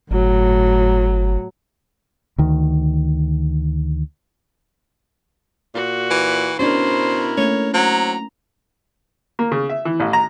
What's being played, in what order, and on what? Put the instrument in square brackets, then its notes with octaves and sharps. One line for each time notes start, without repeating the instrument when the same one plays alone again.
[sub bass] G1 [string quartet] A2 F#3
[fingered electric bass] D2 D#3
[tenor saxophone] A#2 [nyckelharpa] F#4
[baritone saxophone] E3
[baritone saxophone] B2 [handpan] C#4 D4 [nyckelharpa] E4 A#4 [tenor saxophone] C5
[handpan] A3 A#3 C#4 [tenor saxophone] C#5
[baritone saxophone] F#3 [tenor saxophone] C4 [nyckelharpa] A#5
[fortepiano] A#3
C#3
E5
E3
A1
A#5